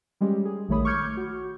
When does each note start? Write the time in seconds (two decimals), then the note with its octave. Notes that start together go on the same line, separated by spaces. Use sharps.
0.21 G3 G#3 C#4 G4
0.45 G#4
0.69 A#1 D#3 A3 C#5 B5 D#6
0.85 C#6 D6 F6 G6 G#6 C#7
1.04 G6
1.17 F#4